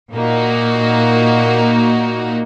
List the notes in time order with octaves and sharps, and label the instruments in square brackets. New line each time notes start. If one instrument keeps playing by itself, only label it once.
[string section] A#2 A#3 D#4 F#4